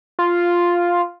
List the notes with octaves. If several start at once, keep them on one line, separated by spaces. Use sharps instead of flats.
F4